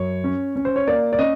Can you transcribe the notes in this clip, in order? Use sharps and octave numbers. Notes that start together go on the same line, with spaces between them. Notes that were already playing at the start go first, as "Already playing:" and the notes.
Already playing: F#2 C#5
C#4
C#4
C5
C#5
A#3 D5
D5
C#4 D#5